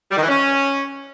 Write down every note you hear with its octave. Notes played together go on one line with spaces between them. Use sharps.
G3
D#3
E3
C#4